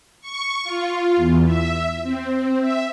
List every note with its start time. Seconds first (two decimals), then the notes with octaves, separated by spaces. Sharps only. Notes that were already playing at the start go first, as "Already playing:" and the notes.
0.21 C#6
0.64 F4
1.16 E2
1.46 E5
2.03 C4
2.61 E5